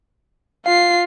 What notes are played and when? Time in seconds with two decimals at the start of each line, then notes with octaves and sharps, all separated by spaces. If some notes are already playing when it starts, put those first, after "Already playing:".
0.66 F4 F5 C7